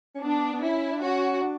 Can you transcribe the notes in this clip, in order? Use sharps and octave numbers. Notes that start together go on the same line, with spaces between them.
C#4
B3 D4
B3
C#4 E4
D4
C#4 F#4
D4